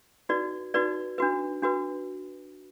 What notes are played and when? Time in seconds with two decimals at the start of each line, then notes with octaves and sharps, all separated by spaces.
0.29 D#4 F#4 B4 D5
0.74 D#4 F#4 B4 D5
1.18 D4 F#4 B4
1.62 D4 F#4 B4